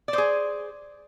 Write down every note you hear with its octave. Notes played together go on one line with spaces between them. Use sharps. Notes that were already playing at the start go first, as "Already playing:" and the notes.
G#4 C5 D5